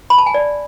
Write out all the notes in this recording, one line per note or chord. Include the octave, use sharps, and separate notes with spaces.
B5
A5
G#5
D5